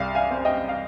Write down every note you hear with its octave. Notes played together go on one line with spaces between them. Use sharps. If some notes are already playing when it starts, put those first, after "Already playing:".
Already playing: C2 D5 F5
F5 G#5
C4
D#5 G5
F5